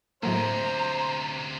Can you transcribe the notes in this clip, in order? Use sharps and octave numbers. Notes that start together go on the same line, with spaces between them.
D2 A2 C3 F#3 A#3 C5 A#5